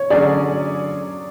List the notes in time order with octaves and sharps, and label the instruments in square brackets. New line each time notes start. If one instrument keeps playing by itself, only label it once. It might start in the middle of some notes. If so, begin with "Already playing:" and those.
Already playing: [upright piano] C#5
[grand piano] D3 F#3 C#4 G#4 [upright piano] D5